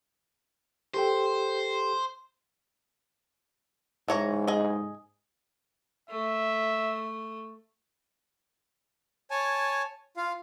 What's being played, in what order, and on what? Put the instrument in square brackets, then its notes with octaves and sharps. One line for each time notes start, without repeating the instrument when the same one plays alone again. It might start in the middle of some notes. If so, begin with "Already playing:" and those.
[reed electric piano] G4 A4 G5 [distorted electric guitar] C5
[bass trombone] G#2 [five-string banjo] E3 C#5 A#5
[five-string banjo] G#4 D#5
[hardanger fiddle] A3 [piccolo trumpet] E5
[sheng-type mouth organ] C#5 G#5 A5
F4 F5